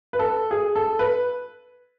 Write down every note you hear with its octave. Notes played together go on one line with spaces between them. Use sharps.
B4
A4
G#4
A4
B4